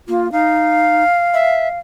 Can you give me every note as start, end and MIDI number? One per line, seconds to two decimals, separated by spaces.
0.08 0.30 58
0.08 0.31 65
0.32 1.03 63
0.32 1.79 77
1.34 1.68 76